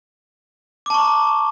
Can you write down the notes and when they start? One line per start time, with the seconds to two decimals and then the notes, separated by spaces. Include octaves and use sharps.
0.86 D6
0.90 A5
0.94 C#6
0.98 A#5